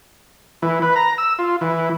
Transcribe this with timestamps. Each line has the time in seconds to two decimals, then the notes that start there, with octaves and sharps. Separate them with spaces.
0.62 E3
0.82 B4
0.96 A#5
1.18 E6
1.39 F4
1.61 E3